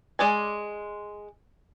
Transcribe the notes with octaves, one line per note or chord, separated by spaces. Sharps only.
G#3 D5 G#5